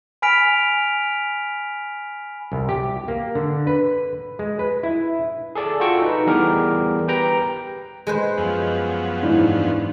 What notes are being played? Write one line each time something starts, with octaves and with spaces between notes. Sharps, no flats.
G#5 B5 F6 B6 D7 F7
C2
G4
A#3
D3
B4
G#3
B4
E4
G#4 A4 D5
F4 F#4 A4 G5 C#6 E6
D#4 B4
E3 G3 B3 G4 G#4 A#4
G4 B4 G5 A#5
G#3 B4 C5
F#2 F3 B3
G#2 E3 D4